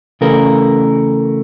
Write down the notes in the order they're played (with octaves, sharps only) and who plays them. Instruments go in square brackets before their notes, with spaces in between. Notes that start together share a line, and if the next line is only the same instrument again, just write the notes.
[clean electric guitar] C#3 E3 A3 A#4